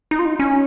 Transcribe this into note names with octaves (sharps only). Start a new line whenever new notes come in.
D#4
F4
D#4
C#4